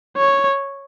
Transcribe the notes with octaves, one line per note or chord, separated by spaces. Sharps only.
C#5